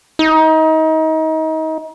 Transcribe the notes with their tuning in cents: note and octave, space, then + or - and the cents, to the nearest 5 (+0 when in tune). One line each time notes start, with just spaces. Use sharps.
D#4 +30